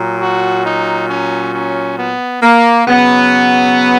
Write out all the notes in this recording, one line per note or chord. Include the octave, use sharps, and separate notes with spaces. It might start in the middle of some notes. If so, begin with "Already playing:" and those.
Already playing: A#2 F#3
F#4
D#4
C#4
C#4
B3
A#3
C#3 F#3 B3